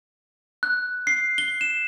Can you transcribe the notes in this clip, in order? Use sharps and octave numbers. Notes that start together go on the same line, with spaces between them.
F#6
C7
G7
E7